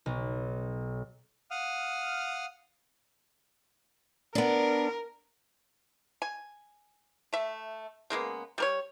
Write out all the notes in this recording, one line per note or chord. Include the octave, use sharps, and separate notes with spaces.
B1
F5 F#5 D#6 F6
B3 D4 A#4
G#5
A3 E5
C#3 G#3 A#3 B3
G3 A#4 C#5